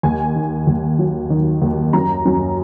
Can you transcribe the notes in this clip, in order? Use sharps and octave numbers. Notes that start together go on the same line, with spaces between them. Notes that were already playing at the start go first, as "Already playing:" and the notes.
D#2 G#5
D#3
D#2
F#3
D#3
D#2
F#2 A#5
F#2